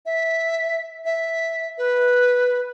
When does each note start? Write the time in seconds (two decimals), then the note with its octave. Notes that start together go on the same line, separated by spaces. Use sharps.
0.06 E5
1.05 E5
1.78 B4